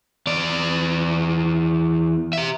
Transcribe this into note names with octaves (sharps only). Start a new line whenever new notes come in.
E2 D5
G4 E5